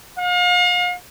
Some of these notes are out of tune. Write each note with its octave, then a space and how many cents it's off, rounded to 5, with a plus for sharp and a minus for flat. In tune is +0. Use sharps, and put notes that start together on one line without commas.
F5 +40